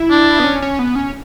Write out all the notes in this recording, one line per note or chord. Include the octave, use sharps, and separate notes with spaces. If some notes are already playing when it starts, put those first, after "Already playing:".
Already playing: E4
D4
B3
C#4
C#4
B3
C#4